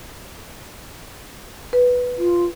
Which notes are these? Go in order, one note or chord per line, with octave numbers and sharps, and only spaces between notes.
B4
F4